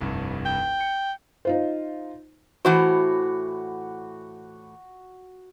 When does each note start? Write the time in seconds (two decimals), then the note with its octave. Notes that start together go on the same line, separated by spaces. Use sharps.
0.01 F1 C2 G2
0.46 G5
0.80 C#7
1.45 D#4 F4 C5
2.65 A2 E3 F#4 C5